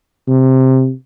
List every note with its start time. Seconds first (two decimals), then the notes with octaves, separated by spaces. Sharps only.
0.28 C3